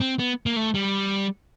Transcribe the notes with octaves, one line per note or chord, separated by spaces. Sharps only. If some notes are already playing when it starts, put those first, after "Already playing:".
C4
B3
A#3
A3
G3